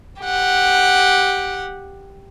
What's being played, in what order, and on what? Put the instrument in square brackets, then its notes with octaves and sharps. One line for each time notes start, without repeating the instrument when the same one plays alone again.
[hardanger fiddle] G4 F#5